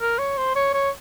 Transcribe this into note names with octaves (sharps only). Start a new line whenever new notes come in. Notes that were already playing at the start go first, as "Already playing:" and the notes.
A#4
C#5
C5
C#5
C#5